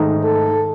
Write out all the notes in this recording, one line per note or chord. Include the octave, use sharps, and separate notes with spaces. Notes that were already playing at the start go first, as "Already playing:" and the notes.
Already playing: G#2 D#3 A3 D#4
A4